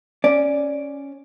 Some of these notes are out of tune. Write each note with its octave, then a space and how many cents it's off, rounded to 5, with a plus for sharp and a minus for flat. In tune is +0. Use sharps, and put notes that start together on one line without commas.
C#4 +0 D5 +0